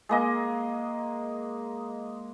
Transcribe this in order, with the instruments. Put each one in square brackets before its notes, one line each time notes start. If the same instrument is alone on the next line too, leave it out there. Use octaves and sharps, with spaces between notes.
[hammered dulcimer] G#3 A#3 D#5